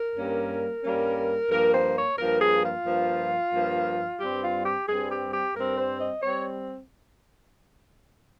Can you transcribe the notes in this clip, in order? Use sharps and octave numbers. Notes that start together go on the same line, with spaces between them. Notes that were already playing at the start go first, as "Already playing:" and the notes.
Already playing: A#4
G2 G3 A#3 C#4
G2 G3 A#3 C#4
G2 F3 A#3 A#4
C5
C#5
G2 F3 A#3 A#4
G#4
F4
G2 F3 A#3
G2 F3 A#3
G2 G3 C4 G4
F4
G4
G2 G3 C4 G#4
G4
G4
G2 G3 C4 A#4
C5
D#5
G3 C4 C#5